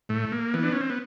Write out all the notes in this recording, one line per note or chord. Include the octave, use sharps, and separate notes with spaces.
A2 A3
A#3
E3 B3
D4
C#4
C4
B3